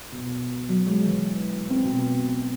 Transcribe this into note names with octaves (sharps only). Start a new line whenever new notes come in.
B2
F#3
G#3
E3
C4
B2